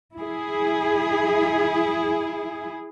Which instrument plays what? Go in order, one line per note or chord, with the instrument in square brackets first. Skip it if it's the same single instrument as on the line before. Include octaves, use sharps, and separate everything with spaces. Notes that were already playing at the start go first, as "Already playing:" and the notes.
[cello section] E4 G#4